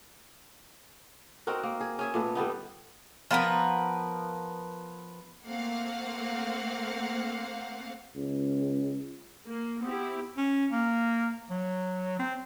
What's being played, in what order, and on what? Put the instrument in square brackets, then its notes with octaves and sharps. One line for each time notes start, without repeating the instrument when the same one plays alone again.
[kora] C4 D#4 F#4 A#4
A#3
G#4
C#4 G#4 E5
A#2 A3 B3
D3 G3 B3 D#4
[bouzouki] F3 B3 A#4 B4
[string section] A3 A#3 C4 F5 F#5
[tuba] C#2
[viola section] A#3
[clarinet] B3 [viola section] C4 E4 G4
[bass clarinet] C#4
A#3
F#3
C4